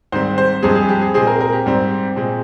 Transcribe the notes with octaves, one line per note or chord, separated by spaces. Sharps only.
G#2 D#3 G3 C4 C5
C5
G2 F3 G#3 C4 G#4
G#4
G4
G#4
A#2 G#3 C4 G#4
A#4
A#4
G4
G#2 G3 C4
A#2 G#3 C4